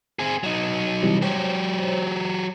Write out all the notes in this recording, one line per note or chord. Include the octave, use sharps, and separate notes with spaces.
C4 G#4
F#3 D#4
C3 E3 G3
F#3 G4 C5 C#5